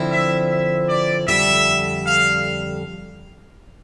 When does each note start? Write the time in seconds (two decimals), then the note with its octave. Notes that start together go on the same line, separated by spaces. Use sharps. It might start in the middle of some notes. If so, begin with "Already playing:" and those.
Already playing: D3 F3 C4 E4
0.11 E5
0.50 E5
0.89 D5
1.28 F2 D3 G3 E5
2.06 F5